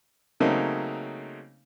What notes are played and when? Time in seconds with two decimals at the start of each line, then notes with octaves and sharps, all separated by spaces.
0.40 C#3 F#3 A3 A#3 C4 D#4